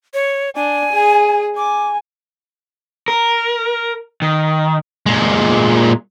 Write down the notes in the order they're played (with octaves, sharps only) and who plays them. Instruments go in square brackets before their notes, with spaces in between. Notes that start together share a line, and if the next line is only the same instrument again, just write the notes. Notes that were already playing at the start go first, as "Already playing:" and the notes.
[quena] C#5
[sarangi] D4 [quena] G#5
[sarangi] G#4
[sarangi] G#5 [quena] D6
[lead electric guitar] A#4
D#3
[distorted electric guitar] A#2 G#3